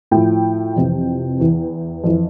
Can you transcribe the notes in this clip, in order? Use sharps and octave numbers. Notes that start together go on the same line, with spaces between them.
A2 F3 G5
F2 C3 E3
E2 E3
F2 E3